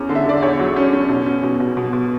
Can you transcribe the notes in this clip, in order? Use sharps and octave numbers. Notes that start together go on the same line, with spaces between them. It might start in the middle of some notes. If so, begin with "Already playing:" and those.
Already playing: E2 C#4
D3
E5
D3 D5
E2 C#5
F#3
C#4
C#4
B2
C#4
B2
B2
B2
B2